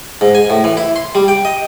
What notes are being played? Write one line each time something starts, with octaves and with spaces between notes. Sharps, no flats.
G#2
G#5
A2
E3
E4
C6
G3
G5
D#5